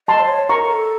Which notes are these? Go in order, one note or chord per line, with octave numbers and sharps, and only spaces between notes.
D#5 A5 C6
C5
C#5
A#4 A#5 C#6
A#4
A4